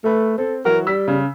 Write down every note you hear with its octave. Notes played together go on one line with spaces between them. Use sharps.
A3 A4 B4
C4 A4
E3 F#3 F#4 A#4
G3 E6 B6
C#3